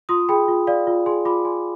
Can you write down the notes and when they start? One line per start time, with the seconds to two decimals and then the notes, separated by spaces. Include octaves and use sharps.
0.09 F4 C6 D#6
0.29 G#4 G5 B5
0.48 F4
0.67 D5 F5
0.87 F4
1.06 G#4 G#5 C6
1.25 F4 B5 D6
1.45 D5 G#5 C6